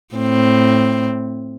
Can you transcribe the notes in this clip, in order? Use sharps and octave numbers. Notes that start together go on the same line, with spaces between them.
A2 C4